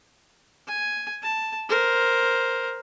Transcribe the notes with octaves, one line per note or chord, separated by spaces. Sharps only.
G#5
A5
A#4 C5